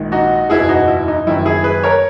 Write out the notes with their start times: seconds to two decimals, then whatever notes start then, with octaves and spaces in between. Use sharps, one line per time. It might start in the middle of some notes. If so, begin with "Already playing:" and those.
Already playing: A#1 G#2 D#3
0.12 D#4 F#4
0.50 F#1 E2 B2 E4 G#4
0.69 D#4 F#4
0.88 E4
1.08 D#4
1.26 F#1 F#2 D#3 E4
1.45 E4 G#4
1.64 G#4 B4
1.83 A#4 C#5